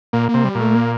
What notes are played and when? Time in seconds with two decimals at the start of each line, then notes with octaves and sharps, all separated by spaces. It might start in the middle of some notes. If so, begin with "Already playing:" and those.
0.13 A#2 A#3
0.29 A#3
0.34 C3
0.44 G3
0.55 A#2
0.60 A3
0.75 A#3